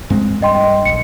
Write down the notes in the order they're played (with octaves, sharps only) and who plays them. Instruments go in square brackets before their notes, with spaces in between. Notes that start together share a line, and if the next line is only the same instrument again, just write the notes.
[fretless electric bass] G2 G#3 C4
[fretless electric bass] G2 [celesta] D#5 G5 C6
[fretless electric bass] A#1 [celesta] C#7